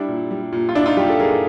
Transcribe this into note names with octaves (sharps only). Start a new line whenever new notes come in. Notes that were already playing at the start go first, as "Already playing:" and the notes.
Already playing: G3 D4 E4
A#2
G3
A#2
F4
A#2 D4 E4
D#4 F4
G3 F4 G4
G4 A4
G3 G#4 A#4